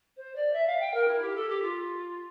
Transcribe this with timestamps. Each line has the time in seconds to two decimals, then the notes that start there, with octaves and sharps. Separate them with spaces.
0.17 C5
0.35 D5
0.53 E5
0.66 F5
0.80 G5
0.94 A#4
1.07 E4
1.21 G4
1.35 A4
1.49 G4
1.62 F4